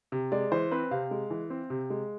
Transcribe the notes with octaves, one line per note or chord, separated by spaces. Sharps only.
C3
G#3 D5
E3 C5
C4 B4
C3 F5
G#3
E3
C4
C3
G#3